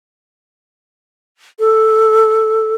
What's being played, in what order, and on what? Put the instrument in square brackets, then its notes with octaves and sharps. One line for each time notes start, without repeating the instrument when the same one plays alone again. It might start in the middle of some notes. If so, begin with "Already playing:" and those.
[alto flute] A4